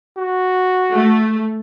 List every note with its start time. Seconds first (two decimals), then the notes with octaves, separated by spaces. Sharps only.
0.18 F#4
0.93 A3